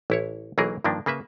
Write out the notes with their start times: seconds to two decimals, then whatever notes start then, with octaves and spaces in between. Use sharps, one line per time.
0.10 A1 E4 C#5
0.58 B1 E3 F#3 A#3 G#4 A#4
0.84 G2 D#3 F3 A#3 D4
1.06 C#3 A#3 B4 E5